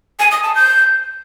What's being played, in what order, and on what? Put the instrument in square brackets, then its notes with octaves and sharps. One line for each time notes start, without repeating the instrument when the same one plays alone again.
[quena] G#5
D#6
A5
G6